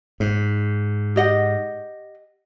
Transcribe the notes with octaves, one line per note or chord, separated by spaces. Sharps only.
G#2
G4 D#5 F#5